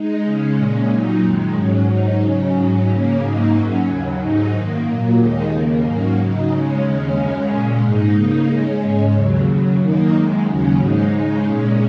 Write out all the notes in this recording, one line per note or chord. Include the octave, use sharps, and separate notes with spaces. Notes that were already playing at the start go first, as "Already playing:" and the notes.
Already playing: G#3 D#4
C#3 G#3 C#4
A#2 G#3 C#4
A#2 F#3 D#4
F#2 D#3 G#3
G#2 F#3 C#4
G#2 F#3 D#4
C#3 F#3 C#4
G#2 F#3 C#4
C#3 A#3 C#4
G#2 F#3 A#3 D#4
F#2 F#3 C#4
D#2 C#3 F#3
G#2 F#3 D#4
F#2 D#3 A#3
A#2 F#3 A#3
D#2 D#3 G#3 D#4
D#2 C#3 A#3
G#2 F#3 A#3 C#4
C#3 F#3 D#4
C#3 G#3 C#4
D#2 C#3 G#3 C#4
F#2 C#3 G#3 C#4
A#2 G#3 C#4
G#2 G#3 D#4
C#3 A#3 D#4
C#3 G#3 C#4
G#2 G#3 C#4
D#2 C#3 F#3
F#2 C#3 F#3
F#2 D#3 A#3 D#4
F#2 D#3 G#3
D#2 C#3 F#3 C#4
G#2 G#3 D#4
C#3 G#3 D#4
A#2 G#3 C#4